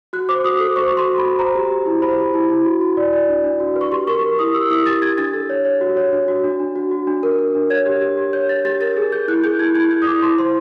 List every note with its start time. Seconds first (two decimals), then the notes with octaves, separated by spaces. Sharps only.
0.13 F#4 F#6
0.29 C5 D6
0.44 F#4 D#6
0.60 A4 D6
0.76 C5 C#6
0.92 F#4
0.97 C6
1.08 F#4
1.18 B5
1.24 F#4
1.39 C5 A#5
1.55 G4
1.71 G4
1.86 E4
2.02 C5 B5
2.18 G4
2.34 E4
2.50 E4
2.65 F#4
2.81 F#4
2.97 D5
3.13 D5
3.29 D4
3.44 D4
3.60 F#4
3.76 B4
3.81 C#6
3.92 G4 C6
4.07 A#4 C#6
4.23 A#4
4.39 E4 D#6
4.54 G4 E6
4.70 E4 D#6
4.86 G4 A6
5.02 G4 G#6
5.18 D4 A6
5.34 A4
5.50 C#5
5.65 C#5
5.81 F#4
5.97 C#5
6.13 D4
6.28 F#4
6.44 D4
6.60 D4
6.76 F#4
6.91 F#4
7.07 D4
7.23 A#4
7.39 A#4
7.55 D4
7.70 C#5 G#6
7.86 G4
8.01 G4
8.17 G4
8.33 C#5 G6
8.49 G4 A6
8.65 G4 A6
8.81 A#4 A6
8.97 G#4
9.12 G#4 G6
9.28 E4 F#6
9.44 G#4 G6
9.59 E4 G#6
9.75 E4 G#6
9.91 E4 G6
10.02 D#6
10.07 E4 D6
10.22 E4 C6
10.38 C5 C6